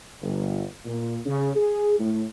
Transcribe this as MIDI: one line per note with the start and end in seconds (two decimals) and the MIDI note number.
0.22 0.63 31
0.85 1.17 46
1.26 1.50 49
1.55 1.97 68
1.99 2.24 45